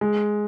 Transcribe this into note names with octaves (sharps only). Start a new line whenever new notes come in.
G#3